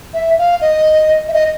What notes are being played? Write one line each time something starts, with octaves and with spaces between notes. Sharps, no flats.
E5
F5
D#5
E5
D#5